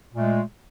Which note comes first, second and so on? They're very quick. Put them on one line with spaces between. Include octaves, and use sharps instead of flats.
A#2 A3 G#3